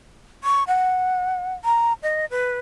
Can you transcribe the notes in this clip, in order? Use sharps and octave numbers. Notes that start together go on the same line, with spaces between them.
C#6
F#5
A#5
D#5
B4